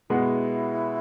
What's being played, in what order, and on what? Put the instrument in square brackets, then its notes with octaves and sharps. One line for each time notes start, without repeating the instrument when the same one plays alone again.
[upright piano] B2 G#3 B3 [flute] E4